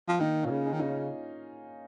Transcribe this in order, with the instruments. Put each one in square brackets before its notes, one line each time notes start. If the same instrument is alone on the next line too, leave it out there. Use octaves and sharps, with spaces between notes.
[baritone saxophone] F3
[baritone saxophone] D#3 [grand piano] A#3 D#4
[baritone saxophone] A#2 [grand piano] C#4 F4
[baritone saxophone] C#3
[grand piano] D#4 G#4
[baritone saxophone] D#3
[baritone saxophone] C#3 [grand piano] D#4
[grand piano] C#4 F4